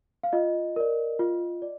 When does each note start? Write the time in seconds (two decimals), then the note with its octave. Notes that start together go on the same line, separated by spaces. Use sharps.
0.23 F5
0.33 F4 D#5
0.76 A#4 D5
1.19 F4
1.62 D5